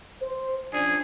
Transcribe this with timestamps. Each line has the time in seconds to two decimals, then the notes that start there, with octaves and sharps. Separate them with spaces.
0.21 C5
0.73 F3 C#4 D4 G#4